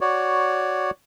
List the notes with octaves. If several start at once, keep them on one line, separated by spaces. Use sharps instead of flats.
F#4 C#5 D5